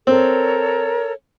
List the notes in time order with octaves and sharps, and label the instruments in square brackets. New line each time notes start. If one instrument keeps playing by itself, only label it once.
[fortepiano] C4 [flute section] A4 A#4 C#5